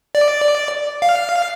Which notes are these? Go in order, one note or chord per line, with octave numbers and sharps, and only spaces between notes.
D5
F5